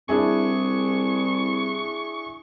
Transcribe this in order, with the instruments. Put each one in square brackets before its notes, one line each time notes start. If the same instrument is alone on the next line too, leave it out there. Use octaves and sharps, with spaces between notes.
[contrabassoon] C2 [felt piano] D4 E4 G#4 [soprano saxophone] C#6